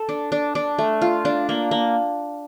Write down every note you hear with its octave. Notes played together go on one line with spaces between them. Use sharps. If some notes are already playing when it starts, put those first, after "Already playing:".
Already playing: A4
D4
D4
D4
A3
F4
D4
A#3
A#3